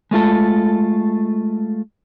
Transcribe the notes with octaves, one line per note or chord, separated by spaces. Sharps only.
G#3 A3 F4 A4